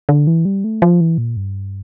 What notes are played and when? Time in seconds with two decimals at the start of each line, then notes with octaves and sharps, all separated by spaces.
0.09 D3
0.27 E3
0.45 G3
0.64 A3
0.82 F3
1.01 E3
1.18 A#2
1.37 G2